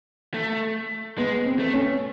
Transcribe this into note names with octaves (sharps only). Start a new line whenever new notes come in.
A3
G#3 B3
C4
A3
C#4